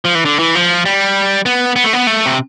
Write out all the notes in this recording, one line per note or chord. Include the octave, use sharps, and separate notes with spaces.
F3
E3
D3
E3
F3
G3
B3
B3
A3
B3
A3
C3